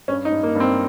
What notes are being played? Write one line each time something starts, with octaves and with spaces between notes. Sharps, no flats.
G2 C#4
D#4
G2
A#3
G2
C4